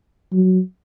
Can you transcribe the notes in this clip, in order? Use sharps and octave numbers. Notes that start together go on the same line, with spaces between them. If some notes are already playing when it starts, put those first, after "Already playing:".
F#3